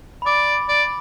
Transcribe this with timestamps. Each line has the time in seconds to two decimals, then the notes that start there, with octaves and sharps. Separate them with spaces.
0.22 B5
0.26 D5 D6
0.69 D5